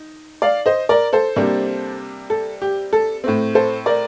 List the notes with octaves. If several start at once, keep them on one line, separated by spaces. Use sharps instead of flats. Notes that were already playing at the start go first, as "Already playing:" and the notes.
Already playing: D#4
D5 F5
C5 D#5
A#4 D5
A4 C5
C3 G3 A#3 D4
A4
G4
A4
A2 A3 C4
A4 C5
A#4 D5